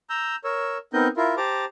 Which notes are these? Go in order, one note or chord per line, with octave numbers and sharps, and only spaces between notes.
A#5 E6 G6
A#4 C#5 E6
B3 C4 D#4 A#4 D#5 G6
E4 F4 A#4
G4 C5 A5 A#5 D6